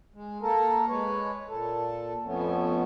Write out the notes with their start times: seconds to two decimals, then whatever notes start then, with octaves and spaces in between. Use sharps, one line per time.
0.14 G#3
0.42 A#3 A4 A#4
0.88 G#3 B4 C#5
1.48 A#2 A4
2.25 F2 F3 A3 B3 C#4